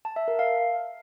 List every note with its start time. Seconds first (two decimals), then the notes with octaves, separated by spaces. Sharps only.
0.05 A5
0.16 E5
0.28 A#4
0.39 F5